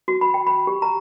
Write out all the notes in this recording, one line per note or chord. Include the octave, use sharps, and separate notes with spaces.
F#4
B5
G5
B5
G4
A#5